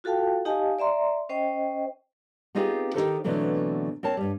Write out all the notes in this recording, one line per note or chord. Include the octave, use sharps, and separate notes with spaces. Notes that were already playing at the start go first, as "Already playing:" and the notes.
F4 F#4 A4 F5 G5 A5
D#4 G4 D#5 F5 G#5 A5
D5 E5 A#5 C6
C#4 C5 D#5 G5
B3 C4 D#4 F4 G4 G#4
D#3 B3 D#4 G4 A4 C5
B2 D3 E3 F#3 A3 C4
C4 A#4 C#5 A5
G2 G3